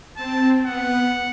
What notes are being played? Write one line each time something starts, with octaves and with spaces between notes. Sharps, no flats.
C4 A5
B3 F#5